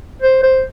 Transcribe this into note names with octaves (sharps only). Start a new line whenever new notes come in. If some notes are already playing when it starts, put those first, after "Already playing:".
C5
C5